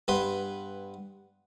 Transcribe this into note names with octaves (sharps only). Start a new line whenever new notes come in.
G2 B3 B4 C6